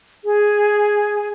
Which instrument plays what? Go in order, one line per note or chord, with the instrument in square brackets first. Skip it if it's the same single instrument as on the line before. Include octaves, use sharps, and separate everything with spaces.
[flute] G#4